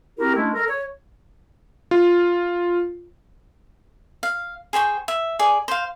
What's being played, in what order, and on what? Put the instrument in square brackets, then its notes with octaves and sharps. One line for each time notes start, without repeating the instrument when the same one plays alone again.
[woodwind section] C4 E4 F#4 G4 A#4
G#3 A3 C#4 D4 E4
A4 A#4
C#5
[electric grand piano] F4
[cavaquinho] F5
G#4 C5 G5 C#6
E5
G#4 D5
C5 F5